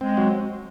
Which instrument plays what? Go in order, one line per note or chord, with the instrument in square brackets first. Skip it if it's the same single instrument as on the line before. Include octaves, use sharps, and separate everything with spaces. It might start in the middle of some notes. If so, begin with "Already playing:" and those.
[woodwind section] G#3 [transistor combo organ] C4
[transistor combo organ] F#3